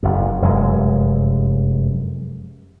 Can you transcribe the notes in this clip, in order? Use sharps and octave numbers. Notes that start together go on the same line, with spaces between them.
F#1 F#2
F1 F#2 G#3